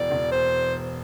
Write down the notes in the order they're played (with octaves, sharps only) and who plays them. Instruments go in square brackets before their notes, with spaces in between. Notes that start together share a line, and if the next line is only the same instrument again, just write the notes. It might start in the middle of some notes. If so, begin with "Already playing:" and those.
Already playing: [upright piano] E1 E2 [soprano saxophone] D5
[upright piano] E1
[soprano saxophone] C5